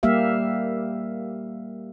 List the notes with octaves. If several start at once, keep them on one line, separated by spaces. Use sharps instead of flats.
G3 A#3 G4 E5 F5